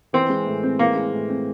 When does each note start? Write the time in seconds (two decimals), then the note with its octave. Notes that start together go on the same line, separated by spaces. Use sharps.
0.13 E3 C4
0.29 G#3
0.46 A2
0.63 C4
0.79 E3 A#3
0.96 G#3
1.13 A2
1.29 C4